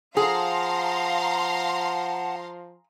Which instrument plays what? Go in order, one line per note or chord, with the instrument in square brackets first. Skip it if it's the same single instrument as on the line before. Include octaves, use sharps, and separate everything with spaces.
[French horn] F3 [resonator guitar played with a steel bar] G#4 [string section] F5 A#5 C6 [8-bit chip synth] F#5 A5